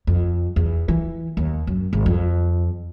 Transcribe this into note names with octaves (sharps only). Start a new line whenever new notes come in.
F2
E2
E3
D#2
F#2
G#1
F2